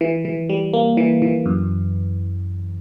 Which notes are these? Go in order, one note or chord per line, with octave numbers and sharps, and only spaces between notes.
E3
E3
G3
A#3
E3
E3
F#2